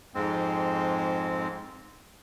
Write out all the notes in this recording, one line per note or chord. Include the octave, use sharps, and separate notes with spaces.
F2 G#2 G#3 C4